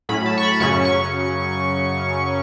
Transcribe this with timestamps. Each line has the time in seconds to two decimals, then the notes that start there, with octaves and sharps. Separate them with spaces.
0.09 A2 F#3 C#4 B5
0.26 A5
0.38 C#6
0.43 B5
0.60 F#2 C#3 F#3 C#4 C#6
0.85 C#6